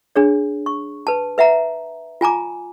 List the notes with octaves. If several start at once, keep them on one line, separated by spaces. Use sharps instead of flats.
D4 G#4 C#5
C#6
B4 A5
B4 E5 F#5 A#5
F4 G#5 A#5 D6